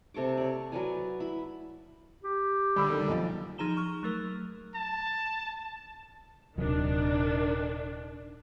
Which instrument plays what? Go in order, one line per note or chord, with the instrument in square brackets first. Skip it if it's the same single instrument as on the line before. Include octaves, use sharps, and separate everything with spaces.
[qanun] C3 A4 C#6 D6
C#5 D5
F#3 B4 D5 G#5
E4 B5
[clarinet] G4
[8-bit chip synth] D3 G3 [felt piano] B5 E6
[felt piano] D#3 A4
B1 F3
[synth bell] F3 D#4 G#4 A#5 E7 G7
C#6 F6
F#3 A3 A#4
[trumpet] A5
[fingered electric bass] D#1 C3 F#3 [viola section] D#3 D4